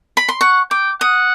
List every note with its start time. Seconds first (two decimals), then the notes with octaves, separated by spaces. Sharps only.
0.17 B5
0.29 C6
0.41 F#5 C#6
0.70 G5 D6
1.01 F#5 D#6